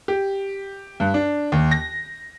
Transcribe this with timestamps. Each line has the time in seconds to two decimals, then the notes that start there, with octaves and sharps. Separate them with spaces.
0.08 G4
1.00 G2
1.14 D4
1.52 D#2
1.71 A#6